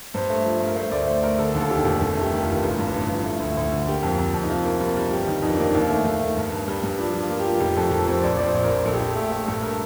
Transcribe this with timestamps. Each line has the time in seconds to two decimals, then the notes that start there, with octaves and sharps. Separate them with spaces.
0.14 G2 C5
0.30 A3
0.45 F3
0.60 G2
0.67 A#4
0.76 A3 C5
0.92 D2 D5
1.07 A3 C5
1.22 A3 A#4
1.39 D3 A4
1.54 D#2
1.61 A4
1.70 F1 G4
1.85 F1
2.01 G2 A4
2.17 A3 G4
2.32 D#3
2.42 F4
2.48 G1
2.63 A1
2.78 G2
2.94 A1
3.09 F3
3.26 A3
3.40 D2
3.57 D2
3.72 D3
3.87 A#3 G4
4.03 F2
4.19 F2
4.34 F2
4.43 D#4
4.49 C3 F4
4.65 A#3
4.81 G3
4.97 G3
5.11 G1 G4
5.27 D#3 D#4
5.42 F2 D#4
5.52 D4
5.59 A#3 D#4
5.75 D#2
5.90 A3
6.05 D#2
6.21 A3
6.37 G2
6.52 G2
6.68 G3
6.83 G2
6.98 F3 D4
7.14 F3
7.20 F4
7.30 A#3
7.39 G4
7.46 F3
7.61 F1 G4
7.76 F2 A4
7.91 F1 A#4
8.07 F2 C5
8.23 A#1 D5
8.37 A#1 D5
8.43 C5
8.54 A#1
8.64 A#4
8.70 A#1
8.85 A#1 A4
8.93 G4
9.00 A#1 A4
9.16 A3 G4
9.32 A3
9.48 G2 A4
9.63 A#4